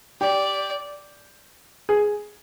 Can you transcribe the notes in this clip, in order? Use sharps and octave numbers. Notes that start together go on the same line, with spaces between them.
G4 D5
G#4